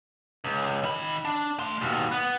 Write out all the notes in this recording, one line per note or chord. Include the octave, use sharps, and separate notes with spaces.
C#2
D#3 B5
D4
A3 C6
D#2 B2
B3